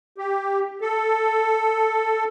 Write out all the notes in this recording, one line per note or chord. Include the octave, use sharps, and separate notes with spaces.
G4
A4